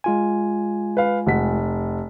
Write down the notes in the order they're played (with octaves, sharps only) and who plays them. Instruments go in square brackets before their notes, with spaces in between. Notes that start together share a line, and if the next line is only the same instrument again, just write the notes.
[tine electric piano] G#3 F4 G#5
[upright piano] B4 F5
F1 F#5 B6